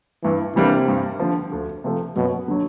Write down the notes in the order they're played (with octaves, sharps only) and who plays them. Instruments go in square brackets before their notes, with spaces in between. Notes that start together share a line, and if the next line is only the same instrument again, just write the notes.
[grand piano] G2 [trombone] E3
[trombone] C3 [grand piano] E3 G3 A#3 D4
[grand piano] G2
D3 F3
D2
C3 F3 A3
[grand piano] F#2 [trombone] B2
[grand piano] D3 F#3